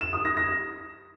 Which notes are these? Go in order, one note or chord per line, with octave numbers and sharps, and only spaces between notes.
E7
D#6
A#6
A#6